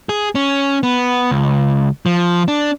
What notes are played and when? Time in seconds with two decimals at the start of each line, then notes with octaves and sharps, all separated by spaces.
0.09 G#4
0.35 C#4
0.83 B3
1.31 C#2
2.06 F3
2.48 D4